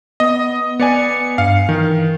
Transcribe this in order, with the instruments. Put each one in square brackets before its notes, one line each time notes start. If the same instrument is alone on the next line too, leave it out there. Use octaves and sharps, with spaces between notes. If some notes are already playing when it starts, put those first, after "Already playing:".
[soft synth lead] B3 [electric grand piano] D#5
[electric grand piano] B3 D5 G#5 [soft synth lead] C#7
[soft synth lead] G2 [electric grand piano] F5
[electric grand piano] D#3 [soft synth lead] E3